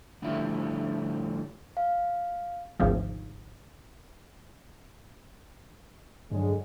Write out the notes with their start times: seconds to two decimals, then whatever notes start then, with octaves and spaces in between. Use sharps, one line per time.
0.22 A2 D3 F3 G3 A3 E4
1.77 F5
2.80 G#1 D2 G#2 C3 F3
6.32 G2 D3 F#3 G#3